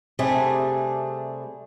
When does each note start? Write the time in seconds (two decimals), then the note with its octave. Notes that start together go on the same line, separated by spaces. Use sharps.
0.19 C3 G3 A3 D4 G#4